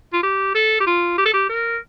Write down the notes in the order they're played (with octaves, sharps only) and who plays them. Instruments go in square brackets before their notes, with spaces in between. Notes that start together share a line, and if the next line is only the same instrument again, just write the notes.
[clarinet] F4
G4
A4
G4
F4
G4
A4
G4
A#4